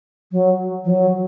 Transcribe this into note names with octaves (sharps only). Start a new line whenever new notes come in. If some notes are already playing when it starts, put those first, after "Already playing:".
F#3
F3
F#3